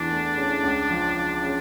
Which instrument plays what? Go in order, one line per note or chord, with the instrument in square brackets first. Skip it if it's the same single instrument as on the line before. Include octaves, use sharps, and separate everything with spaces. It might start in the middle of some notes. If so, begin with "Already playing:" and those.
Already playing: [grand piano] E2 E3 [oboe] D4
[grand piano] A3
C#3
C#2
F3
F3
C#3